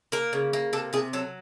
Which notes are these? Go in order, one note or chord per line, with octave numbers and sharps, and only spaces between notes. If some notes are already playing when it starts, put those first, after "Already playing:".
A#3 A#4
C#3
A#3
C3 A4
C3 G#4
F#3 A4